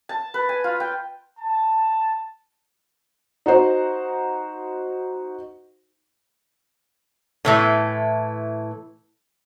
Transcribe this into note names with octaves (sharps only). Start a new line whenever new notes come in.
A5
B4
G#5
F4
G5
A5
D#4 F#4 C5
A2 E3 A3